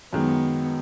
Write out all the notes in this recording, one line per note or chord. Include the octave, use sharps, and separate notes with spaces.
F#2 D#3 G#3 B3